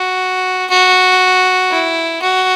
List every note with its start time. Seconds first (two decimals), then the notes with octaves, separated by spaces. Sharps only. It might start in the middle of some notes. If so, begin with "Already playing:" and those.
Already playing: F#4
0.70 F#4
1.71 E4
2.22 F#4